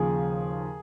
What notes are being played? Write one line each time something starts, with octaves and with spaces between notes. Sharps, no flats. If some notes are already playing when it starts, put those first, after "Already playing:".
Already playing: D#2 C#3 F3 G#4